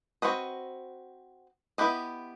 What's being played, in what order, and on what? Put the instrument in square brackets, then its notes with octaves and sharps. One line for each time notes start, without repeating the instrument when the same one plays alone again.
[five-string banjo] C4 F#4 B4 D#5
B3 E4 G4 B4 D#5